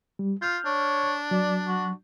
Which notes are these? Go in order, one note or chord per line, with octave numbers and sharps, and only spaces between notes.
G3
F4 F6 G6
D4 C#5
F#3 D5
F#4